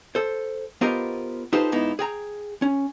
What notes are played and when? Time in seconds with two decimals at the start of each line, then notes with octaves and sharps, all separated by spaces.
0.15 A4 C5
0.81 B3 F4 G4 A#4 C5 D#5
1.53 D#4 F4 G4 A4 B4 C5
1.72 G#2 B3 D#4 E4
1.99 G#4 G5 A#5
2.62 C#4